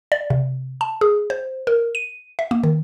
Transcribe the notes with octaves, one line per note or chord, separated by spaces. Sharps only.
D5
C3
A5
G#4
C5
A#4
D#7
E5
A#3
D#3